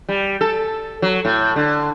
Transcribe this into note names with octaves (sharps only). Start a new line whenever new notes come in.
G3
A4
F#3
A2
D3